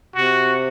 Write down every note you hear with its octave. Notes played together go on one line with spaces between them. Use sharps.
C3 F#4